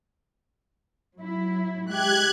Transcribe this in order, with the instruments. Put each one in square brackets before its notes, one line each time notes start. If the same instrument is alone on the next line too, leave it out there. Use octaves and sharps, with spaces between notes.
[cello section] F#3 E4
[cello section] G#3 G4 [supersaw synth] F#6 G#6